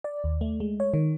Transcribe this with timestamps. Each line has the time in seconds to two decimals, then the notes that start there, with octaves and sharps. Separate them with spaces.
0.04 D5
0.24 D#2
0.41 A3
0.60 G#3
0.80 C#5
0.94 D#3